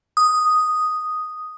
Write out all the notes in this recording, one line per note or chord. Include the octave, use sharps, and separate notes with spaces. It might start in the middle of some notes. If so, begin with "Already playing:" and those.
D#6